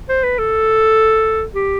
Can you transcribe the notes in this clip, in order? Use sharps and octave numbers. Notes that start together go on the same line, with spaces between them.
C5
B4
A4
G4